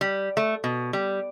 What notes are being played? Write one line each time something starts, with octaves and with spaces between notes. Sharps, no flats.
G3
A3
B2
G3